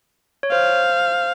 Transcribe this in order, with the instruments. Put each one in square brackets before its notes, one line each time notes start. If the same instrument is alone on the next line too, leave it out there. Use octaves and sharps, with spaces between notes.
[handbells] C#5
[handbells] C5 [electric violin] F5